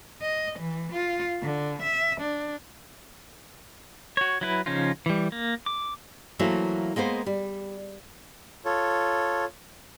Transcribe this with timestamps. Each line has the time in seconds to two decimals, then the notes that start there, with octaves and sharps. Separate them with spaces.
0.22 D#5
0.59 E3
0.92 F4
1.43 D3
1.82 E5
2.21 D4
4.17 F#4 C#5
4.41 F#3 E4 B4
4.66 C#3 F3 C#4 D#4 F4
5.06 E3 G3
5.32 A#3
5.66 D6
6.39 E3 F#3 A3 A#3 C5
6.96 G#3 A#3 B3 C5
7.26 G3
8.65 F4 A4 C#5